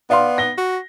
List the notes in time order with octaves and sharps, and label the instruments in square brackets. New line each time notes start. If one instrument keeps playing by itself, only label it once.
[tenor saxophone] B3 [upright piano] D5 F5 C6
[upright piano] A#6 G7
[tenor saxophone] F#4